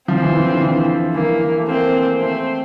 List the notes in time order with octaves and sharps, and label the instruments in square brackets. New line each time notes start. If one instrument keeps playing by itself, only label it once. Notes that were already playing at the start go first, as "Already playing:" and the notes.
[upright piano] F3 [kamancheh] C4
[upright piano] E3
E3
D3
E3
[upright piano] E3 [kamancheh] A#3
[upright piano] A3
[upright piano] A#3 [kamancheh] C4
[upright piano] A3 [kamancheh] C4